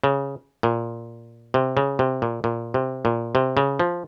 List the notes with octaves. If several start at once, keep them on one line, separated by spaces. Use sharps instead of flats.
C#3
A#2
C3
C#3
C3
A#2
A#2
C3
A#2
C3
C#3
F3